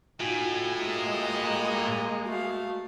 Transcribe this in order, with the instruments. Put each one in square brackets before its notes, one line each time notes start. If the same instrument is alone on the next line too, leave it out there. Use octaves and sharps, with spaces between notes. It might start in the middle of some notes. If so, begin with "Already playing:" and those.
[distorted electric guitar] A2 [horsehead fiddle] D#4 G#5 [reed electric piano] F4 F#4
[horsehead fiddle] G#3 A#3 [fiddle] D#5 A#5
[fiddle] A3 F5 [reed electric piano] F#4